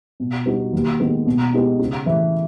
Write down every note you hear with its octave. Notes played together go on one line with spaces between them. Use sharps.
B2
G3 B3 D#4 F#4
D#2
D#3 G#3 B3
B2
G#3 B3 D#4 G4
C#3
E3 A3